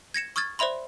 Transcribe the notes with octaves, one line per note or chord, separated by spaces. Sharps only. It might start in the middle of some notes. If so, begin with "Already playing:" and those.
G#6 A#6 C#7 E7
C#6 D#6 F6 G#6 A6
C5 D5 E5 B5 C6